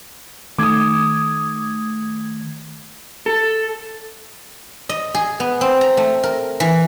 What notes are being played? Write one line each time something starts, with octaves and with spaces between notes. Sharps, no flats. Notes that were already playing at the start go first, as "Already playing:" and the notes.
D#3 A3 D6 D#6 G#6
A4
D#5
G#4
B3
C4
A#5
A3
A#4
E3